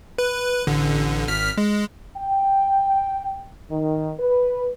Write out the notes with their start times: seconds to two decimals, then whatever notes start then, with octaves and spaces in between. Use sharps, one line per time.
0.18 B4
0.67 A1 D3
1.28 G#1 F6 B6
1.57 G#3
2.17 G5
3.70 D#3
4.19 B4